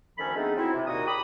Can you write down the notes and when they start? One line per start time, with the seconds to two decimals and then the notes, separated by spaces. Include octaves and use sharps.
0.18 D2 D#3 F3 C#4 A4 B5
0.36 G#3 A3 B3 C4 D4 D#4
0.56 F#3 C4 D#4 E4
0.73 C3
0.86 D#2 A#2 D#4 F#4 D#5 D#6
1.06 G4 B5 D#6